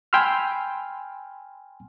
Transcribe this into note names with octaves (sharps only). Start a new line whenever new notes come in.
G5 G#5 B5 C6 E6 F6